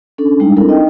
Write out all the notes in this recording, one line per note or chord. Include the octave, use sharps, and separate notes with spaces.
C#4 D4 A4
G3 G#3 D4 D#4
C4 D4 E4 A4 A#4
D#4 D#5 G5